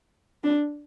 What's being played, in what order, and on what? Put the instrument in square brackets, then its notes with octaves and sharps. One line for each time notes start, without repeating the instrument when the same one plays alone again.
[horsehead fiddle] D4